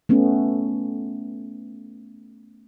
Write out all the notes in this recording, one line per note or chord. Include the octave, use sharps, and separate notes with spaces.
A3 B3 C#4